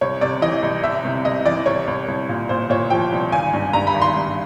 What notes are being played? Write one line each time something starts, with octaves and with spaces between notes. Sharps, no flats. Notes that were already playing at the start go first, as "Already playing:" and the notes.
C2 C#5
C3 D5
E3 D#5
C2
C2 E5
C3
C2 D#5
E3 D5
C2 C#5
C2
C2
A#2
A#2 C5
A#2 C#5
F3 G5
C2
G#1 G#5
G2
G2 A#5
B5
G#1
C6
G2